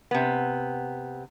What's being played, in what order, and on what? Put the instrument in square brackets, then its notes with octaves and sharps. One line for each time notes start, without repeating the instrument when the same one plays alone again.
[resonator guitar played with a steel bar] C3 B3